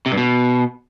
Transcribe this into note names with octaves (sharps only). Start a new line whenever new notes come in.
C3
G2
B2